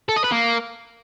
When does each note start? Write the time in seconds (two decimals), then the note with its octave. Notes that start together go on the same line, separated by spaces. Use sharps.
0.09 A4
0.17 D#5
0.24 B4
0.32 A#3